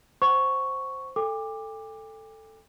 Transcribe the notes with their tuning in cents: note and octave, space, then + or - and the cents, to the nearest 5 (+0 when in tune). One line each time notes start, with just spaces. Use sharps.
C5 +0 F#5 +25 C#6 +0
A4 +5 G5 +45 D6 +10